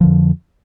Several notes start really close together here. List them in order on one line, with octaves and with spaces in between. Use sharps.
F3 D3 F2